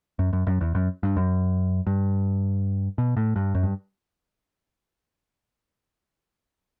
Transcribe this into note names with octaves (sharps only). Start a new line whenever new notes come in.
F#2
F#2
F#2
E2
F#2
G2
F#2
G2
B2
A2
G2
F#2
G2